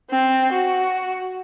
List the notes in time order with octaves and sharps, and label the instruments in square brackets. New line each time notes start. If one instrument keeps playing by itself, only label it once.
[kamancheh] C4
F#4